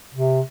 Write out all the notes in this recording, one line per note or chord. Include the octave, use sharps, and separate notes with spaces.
C3